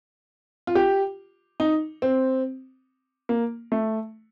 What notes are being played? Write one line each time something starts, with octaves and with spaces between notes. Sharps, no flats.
F4
G4
D#4
C4
A#3
A3